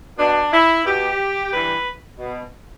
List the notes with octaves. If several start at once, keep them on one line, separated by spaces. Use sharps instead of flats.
B2 D4
E4
B2 G4
G2 E3 B4
B2